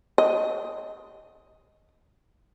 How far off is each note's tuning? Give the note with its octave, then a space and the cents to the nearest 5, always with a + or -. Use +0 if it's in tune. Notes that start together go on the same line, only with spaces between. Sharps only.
D#5 +5